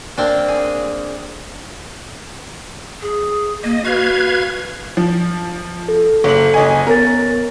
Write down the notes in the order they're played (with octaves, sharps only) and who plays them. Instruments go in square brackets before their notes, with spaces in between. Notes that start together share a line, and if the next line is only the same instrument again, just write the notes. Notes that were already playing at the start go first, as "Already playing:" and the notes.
[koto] A#3 C4 D4
G#4
[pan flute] G#4
[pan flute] A#3 [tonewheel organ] D#5
[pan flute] F#4 [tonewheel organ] B4 F5 G#6
[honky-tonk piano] F3
[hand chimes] A4
[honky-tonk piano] F#1 F#7
F#1 D#5 G#5
[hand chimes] B3 C#5 A6 [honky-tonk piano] A#4